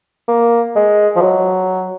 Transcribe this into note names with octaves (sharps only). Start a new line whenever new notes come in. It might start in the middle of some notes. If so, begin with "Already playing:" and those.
A#3
G#3
F3
F#3